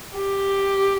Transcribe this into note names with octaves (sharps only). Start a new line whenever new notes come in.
G4